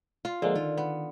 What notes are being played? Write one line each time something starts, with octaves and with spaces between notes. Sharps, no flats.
F4
D3 F3 G#3 A#3
D#3 F4
B3